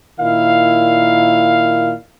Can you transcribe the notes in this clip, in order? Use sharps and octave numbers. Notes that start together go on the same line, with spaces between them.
A#2 D#3 E4 F5